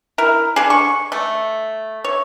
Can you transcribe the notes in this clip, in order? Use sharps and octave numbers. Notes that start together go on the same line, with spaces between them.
E4 A#4
D3 G#4
C#6
A3
C#5